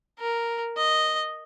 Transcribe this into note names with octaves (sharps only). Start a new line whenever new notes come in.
A#4
D#5